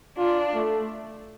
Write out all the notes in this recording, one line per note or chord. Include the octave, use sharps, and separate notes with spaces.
D4 F4
A3